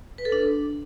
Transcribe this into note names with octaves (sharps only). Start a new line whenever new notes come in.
B4
A4
D4